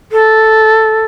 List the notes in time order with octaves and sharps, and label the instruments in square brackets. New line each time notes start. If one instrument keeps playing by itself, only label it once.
[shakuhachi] A4